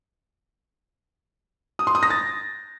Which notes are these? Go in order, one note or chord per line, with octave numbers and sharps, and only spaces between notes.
D#6
C6
D#6
A#6
A6